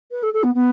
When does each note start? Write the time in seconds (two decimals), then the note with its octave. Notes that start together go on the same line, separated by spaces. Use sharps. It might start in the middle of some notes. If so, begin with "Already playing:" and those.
0.11 B4
0.23 A4
0.33 A4
0.43 B3
0.54 B3